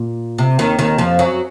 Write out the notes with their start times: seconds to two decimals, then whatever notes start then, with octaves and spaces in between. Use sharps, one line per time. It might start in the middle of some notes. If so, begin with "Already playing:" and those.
Already playing: A#2
0.38 C3
0.59 D#2 D#3
0.79 D#2 D#3
0.98 F2 F3
1.19 F#2 F#3